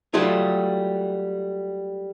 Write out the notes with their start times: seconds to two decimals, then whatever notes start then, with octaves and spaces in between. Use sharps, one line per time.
0.14 F#3 G3 A3 F4 G#4